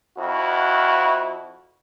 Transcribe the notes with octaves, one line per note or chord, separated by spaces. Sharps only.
F2 E4 F#4